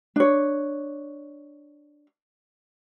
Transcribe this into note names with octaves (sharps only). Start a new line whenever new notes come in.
D4 C#5